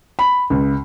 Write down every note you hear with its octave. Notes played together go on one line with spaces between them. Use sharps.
B5
C#2